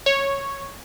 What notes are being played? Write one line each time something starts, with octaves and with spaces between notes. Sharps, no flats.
C#5